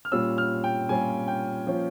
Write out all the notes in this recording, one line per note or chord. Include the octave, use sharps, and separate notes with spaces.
F6
A#2 G3 C#4 F4 E6
F6
G5
A#2 G3 C#4 F4 G#5
G5
F3 A#3 C#4 F4